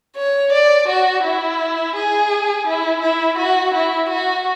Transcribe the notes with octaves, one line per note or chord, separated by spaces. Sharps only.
C#5
D5
F#4
E4
G#4
E4
E4
F#4
E4
F#4